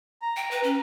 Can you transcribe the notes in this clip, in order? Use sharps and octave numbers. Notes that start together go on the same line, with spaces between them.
A#5
G5
B4
C#4